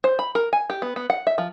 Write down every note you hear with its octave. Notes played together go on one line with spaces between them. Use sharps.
C5
B5
A#4
G#5
G4
B3
B3
F#5
E5
F3